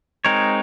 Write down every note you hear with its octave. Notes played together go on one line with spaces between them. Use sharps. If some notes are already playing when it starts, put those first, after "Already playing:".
G#3 C4 D#4 A#4 C#5